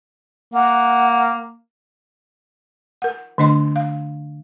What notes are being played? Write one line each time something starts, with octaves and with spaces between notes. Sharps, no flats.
A#3 F#5
A#4 F#5
D3 A3 D4 D#5 C6
F5